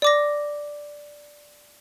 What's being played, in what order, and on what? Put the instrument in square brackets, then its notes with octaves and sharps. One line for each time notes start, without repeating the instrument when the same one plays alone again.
[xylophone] D5 D6 A#6